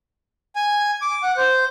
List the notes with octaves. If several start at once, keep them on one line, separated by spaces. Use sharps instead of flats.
G#5
D6
F#5
C5